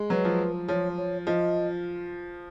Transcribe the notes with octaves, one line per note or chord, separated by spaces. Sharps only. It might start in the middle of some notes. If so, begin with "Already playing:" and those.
Already playing: G#3
F#3 B4
F3
F3 C#5
C#5
F3 D#5